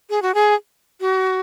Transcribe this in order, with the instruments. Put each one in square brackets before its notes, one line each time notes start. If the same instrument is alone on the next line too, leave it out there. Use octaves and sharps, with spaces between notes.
[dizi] G#4
F#4
G#4
F#4